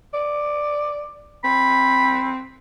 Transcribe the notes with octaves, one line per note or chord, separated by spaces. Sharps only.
D5
C4 B5